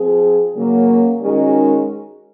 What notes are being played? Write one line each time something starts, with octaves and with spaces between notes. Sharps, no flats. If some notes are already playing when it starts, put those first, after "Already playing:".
Already playing: F3 C4 F4 G#4
C#3 F#3 A#3 C#4
D#3 G#3 C#4 F#4 A#4